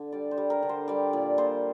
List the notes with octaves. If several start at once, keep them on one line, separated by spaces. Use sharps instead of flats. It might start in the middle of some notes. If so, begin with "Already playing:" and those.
Already playing: D3
G3 D5
C5
G3
A#4
D3
C5
G3 D5
A#2 D5
A#2 C5